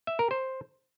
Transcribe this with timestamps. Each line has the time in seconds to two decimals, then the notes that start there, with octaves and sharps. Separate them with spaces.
0.07 E5
0.19 A#4
0.31 C5